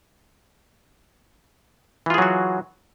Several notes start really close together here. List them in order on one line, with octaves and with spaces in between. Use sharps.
E3 F4 G#4 F#3 F#4